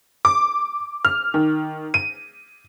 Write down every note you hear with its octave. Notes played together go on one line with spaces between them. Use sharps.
D6
F6
D#3
D#7